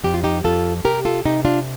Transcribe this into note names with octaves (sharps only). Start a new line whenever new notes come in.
F2 G4
F4
D#4 G4
F2 F4 A4
C3 G4 A#4
F4 A4
C3 D#4 G4
D4 F4